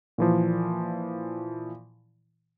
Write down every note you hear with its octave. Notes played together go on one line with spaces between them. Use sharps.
A#2 E3 F3